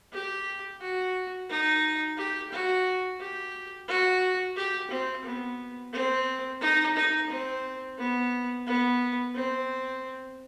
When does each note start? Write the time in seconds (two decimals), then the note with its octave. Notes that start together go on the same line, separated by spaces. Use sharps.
0.13 G4
0.81 F#4
1.50 D#4
2.17 G4
2.52 F#4
3.20 G4
3.88 F#4
4.57 G4
4.91 C4
5.25 B3
5.93 C4
6.61 D#4
6.96 D#4
7.30 C4
7.98 B3
8.67 B3
9.35 C4